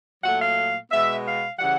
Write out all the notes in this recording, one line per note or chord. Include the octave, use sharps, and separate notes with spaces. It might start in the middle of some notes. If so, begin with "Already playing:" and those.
A#2 F#3 A3 F#5
F5
B2 G#3 B3 E5
F5
C#3 E3 G3 F#5